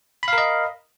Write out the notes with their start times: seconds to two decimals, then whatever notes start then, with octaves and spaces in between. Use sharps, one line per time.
0.23 B5
0.28 F5
0.33 A#4
0.38 D#5